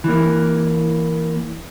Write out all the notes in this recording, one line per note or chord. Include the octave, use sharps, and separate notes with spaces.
E3 A#3